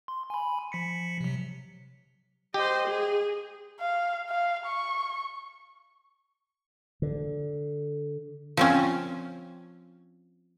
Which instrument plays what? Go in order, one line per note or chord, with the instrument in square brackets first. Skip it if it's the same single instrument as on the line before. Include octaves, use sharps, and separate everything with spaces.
[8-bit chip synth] C6
G#5 B5
F3 B6 C#7
C3 F#3
[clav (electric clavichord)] G4 [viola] C5 D#5
[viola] G#4
[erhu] F5
F5
C#6
[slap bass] D3
[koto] F3 C4 C#4